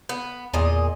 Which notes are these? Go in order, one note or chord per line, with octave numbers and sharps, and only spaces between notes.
B3
E2 A#2 G#4 D#5